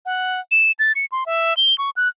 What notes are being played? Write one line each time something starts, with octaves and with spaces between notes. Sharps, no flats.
F#5
E7
A6
C#7
C6
E5
G7
C#6
F#6